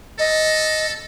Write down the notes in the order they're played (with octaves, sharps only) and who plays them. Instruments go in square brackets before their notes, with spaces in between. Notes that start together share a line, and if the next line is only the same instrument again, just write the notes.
[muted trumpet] A4 [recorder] D#5